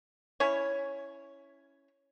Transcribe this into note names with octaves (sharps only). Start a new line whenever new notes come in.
C#4 E4 C#5